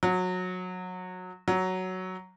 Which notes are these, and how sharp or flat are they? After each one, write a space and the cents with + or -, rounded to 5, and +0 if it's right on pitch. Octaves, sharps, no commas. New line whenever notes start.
F#3 -20
F#3 +5